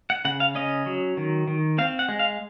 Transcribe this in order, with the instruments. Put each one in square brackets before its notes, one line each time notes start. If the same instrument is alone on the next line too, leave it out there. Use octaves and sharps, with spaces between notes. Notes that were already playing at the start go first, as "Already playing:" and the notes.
[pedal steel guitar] F#5
C#3 F#5
F5
C#4 D#5
F#3
D#3
D#3
C4 F5
F#5
G#3
F5